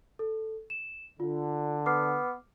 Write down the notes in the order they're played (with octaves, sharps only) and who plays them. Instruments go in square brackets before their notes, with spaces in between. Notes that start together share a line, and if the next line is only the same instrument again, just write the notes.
[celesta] A4
E7
[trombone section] D3 [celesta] F4
[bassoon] B3 [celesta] D6 F6 C7